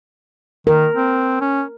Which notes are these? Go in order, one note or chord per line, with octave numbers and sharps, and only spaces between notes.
D#3 A#4
C4
C#4